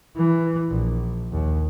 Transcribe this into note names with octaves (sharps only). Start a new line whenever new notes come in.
E3
A#1
D#2